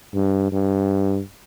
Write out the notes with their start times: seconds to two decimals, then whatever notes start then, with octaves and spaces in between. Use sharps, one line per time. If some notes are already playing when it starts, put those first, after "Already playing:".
0.14 G2
0.52 G2